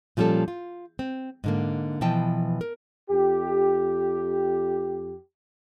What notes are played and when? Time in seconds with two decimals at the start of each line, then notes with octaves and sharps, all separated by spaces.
0.17 A#2 F3 G3 C#4 A4
0.48 F4
0.99 C4
1.44 G#2 D3 A#3
2.01 B2 E3 F3 G5 A5
2.61 A#4
3.10 F2 G4